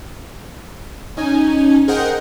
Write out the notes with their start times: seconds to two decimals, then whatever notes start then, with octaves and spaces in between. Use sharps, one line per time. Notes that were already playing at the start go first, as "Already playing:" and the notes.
1.17 C#4 D#4 G#5
1.88 G#4 A#4 C5 D#5 F#5 G5